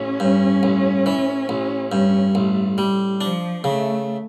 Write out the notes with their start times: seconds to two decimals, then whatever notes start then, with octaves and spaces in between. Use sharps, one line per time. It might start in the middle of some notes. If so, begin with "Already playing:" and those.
Already playing: A1 C#4
0.20 G2
0.63 A1
1.06 E3
1.49 A1
1.92 G2 C#4
2.35 A1 A3
2.78 G3
3.21 F3 D4
3.64 C#3 A3